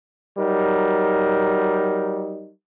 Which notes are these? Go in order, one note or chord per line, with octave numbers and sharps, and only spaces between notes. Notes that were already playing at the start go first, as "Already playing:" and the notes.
F#3 G3 D#4 A#4